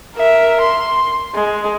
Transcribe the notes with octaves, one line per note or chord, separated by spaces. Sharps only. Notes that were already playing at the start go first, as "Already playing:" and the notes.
A#4 E5
C6
G#3